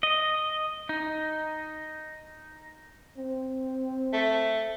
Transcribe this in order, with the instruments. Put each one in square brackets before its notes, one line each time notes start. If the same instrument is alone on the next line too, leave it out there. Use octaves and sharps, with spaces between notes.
[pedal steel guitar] D#5
D#4
[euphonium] C4
[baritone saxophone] A3